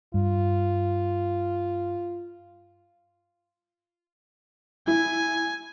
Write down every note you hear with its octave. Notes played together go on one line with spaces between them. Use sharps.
G2 F4
E4 G#5